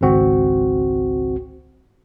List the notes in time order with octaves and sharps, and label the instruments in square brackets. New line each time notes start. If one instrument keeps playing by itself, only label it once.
[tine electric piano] G#1 C#2 C4 F#4